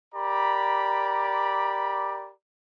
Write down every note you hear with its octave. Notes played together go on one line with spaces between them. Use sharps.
G4 A#4 D5 A#5 B5